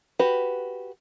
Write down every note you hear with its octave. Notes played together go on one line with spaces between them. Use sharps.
F#4 G4 B4